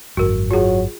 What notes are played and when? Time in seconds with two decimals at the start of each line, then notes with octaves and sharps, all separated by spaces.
0.17 G#1 F#2 F#4 A#4
0.51 F#3 F4 G#4